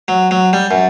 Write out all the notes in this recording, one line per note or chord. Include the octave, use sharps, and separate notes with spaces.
F#3
F#3
G3
F#2